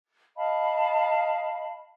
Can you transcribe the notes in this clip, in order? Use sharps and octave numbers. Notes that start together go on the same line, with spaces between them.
D#5 F5 A5 B5